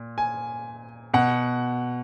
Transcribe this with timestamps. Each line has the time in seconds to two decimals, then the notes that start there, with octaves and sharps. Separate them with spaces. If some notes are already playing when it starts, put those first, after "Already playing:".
Already playing: A#2
0.18 G#5
1.14 B2 F#5